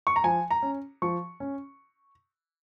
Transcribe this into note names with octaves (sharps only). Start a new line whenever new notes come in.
C#6
A#5
F3 G#5
A#5
C#4
F3 C#6
C#4